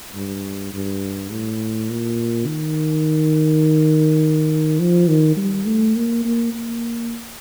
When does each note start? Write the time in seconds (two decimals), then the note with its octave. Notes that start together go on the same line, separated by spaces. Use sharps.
0.15 G2
0.73 G2
1.31 A2
1.90 A#2
2.47 D#3
4.80 F3
5.08 D#3
5.37 G3
5.66 A3
5.96 A#3
6.25 A#3
6.54 A#3